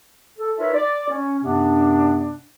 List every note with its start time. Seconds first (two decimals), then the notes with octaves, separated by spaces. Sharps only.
0.38 A4
0.58 D#4 F4 A#4 B4 C#5 E5
0.74 D5
1.10 C#4
1.43 F#2 C3 B3 D4